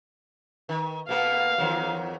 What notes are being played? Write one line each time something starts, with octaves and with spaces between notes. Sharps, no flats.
D#3
B2 A#3 B3 F5
E2 D#3 F#3